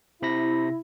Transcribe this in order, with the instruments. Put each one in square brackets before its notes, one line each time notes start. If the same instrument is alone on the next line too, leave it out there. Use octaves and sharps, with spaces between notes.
[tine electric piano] C3 B5 A#6 [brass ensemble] E4